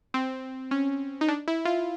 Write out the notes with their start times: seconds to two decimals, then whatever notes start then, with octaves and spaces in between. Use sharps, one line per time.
0.14 C4
0.71 C#4
1.21 D#4
1.28 D4
1.48 E4
1.65 F4